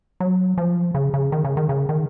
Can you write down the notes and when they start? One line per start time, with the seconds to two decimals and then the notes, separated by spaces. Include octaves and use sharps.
0.20 F#3
0.58 F3
0.94 C#3
1.14 C#3
1.32 D#3
1.45 C#3
1.57 D#3
1.69 C#3
1.89 D#3